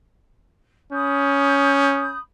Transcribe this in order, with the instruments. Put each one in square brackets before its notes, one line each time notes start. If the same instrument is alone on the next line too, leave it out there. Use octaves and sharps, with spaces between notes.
[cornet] C#4 [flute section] B5 D#6 G6